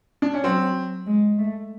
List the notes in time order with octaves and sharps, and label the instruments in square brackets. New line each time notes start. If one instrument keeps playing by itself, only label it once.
[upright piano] D4
C#4
[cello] F#3 [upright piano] C4
[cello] G#3
A3